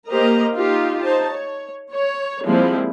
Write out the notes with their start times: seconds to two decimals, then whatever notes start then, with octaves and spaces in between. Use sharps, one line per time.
0.11 A#3 G4 A#4 C5 D#5 A#5
0.55 D#4 F4 G4
1.02 D#4 C5 A5
1.31 C#5
1.93 C#5
2.46 F3 G3 G#3 A#3 C4 E4